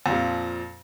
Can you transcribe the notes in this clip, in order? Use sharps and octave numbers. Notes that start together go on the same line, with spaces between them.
F2 A#2 F3